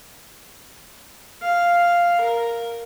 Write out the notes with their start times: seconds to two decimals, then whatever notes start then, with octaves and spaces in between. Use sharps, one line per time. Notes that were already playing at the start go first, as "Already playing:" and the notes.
1.42 F5
2.21 A#4